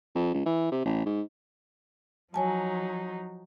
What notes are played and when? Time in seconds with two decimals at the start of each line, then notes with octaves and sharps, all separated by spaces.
0.16 F2
0.34 C#2
0.46 E3
0.72 C3
0.86 A1
1.06 G#2
2.34 F3 F#3 D#4 C#5 G#5 A5